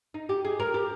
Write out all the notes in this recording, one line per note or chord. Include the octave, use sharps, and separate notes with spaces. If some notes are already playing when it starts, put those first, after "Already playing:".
D#4
G4
G#4
A#4
G4